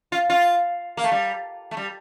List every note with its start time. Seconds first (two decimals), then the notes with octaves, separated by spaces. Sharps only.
0.12 F4
0.30 F4
0.97 A#3
1.04 A3
1.12 G3
1.71 A3
1.77 G3